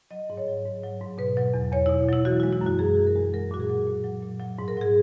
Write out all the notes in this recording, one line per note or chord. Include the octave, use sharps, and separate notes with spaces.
F#3 D#5
G#2
C#5
F#3
G#2
F#3
G#2
B2 B4
F#3
E2
E2 C#5
B2 E4
F#3 E4
E3 F#4
G#3 F#4
E4
F#2
F#4
F#2 G#4
E3
A#4
G#3
F#3 A#4
A#2 F#4
G#4
F#3
A#2
F#3
A#2
F#3
G#2
A#4
F#3 G#4